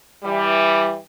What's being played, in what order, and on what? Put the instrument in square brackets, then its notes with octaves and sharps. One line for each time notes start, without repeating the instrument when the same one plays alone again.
[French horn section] E3 G3